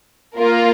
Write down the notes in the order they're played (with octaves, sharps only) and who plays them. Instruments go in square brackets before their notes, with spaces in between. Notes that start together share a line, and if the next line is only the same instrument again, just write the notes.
[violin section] A#3 F4 A#4